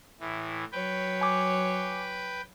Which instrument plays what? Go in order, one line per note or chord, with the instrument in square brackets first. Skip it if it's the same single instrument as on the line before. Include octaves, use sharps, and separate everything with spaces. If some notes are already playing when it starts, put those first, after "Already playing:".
[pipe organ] A2 E3
[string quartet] F#3 C#5 [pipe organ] B4 G5
[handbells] G#5 D6